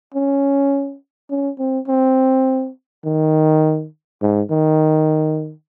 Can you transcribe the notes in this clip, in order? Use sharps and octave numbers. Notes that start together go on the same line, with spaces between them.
C#4
C#4
C4
C4
D#3
G#2
D#3